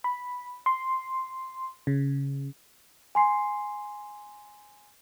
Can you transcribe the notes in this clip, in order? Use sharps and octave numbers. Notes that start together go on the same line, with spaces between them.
B5
C6
C#3
G#5 C6 C7